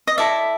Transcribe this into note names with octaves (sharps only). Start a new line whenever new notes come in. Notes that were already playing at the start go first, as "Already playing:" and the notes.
D#5
E4 A4 D5 E5